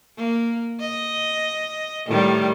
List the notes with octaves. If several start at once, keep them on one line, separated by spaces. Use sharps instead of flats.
A#3
D#5
A2 D#3 G3